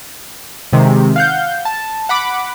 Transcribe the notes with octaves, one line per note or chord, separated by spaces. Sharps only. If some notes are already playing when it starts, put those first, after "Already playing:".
C3 D#3 G#3
F5 F#5 G6
A5
F#5 B5 D6